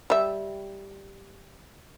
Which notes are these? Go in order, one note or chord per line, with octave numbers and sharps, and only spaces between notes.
G3 E5